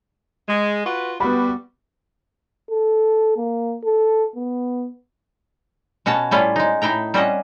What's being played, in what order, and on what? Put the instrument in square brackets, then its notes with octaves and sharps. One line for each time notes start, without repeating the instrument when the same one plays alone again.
[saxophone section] G#3
F4 F#4 B4
[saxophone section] G3 F#4 [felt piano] B3 B5
[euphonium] A4
A#3
A4
B3
[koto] B2 C#4 F#4 C#5 A5
A2 G3 C#4 E4 F4
G#3 D#4
A2 D#4 E4 G5 A#5
G3 C4 C#4 D#5 F#5